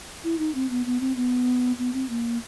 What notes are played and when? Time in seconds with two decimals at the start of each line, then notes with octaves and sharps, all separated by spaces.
0.24 E4
0.39 D#4
0.55 C4
0.70 B3
0.86 B3
1.01 C4
1.16 B3
1.79 B3
1.94 C4
2.09 A#3